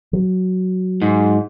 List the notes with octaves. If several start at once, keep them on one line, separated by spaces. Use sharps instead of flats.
F#3
G#2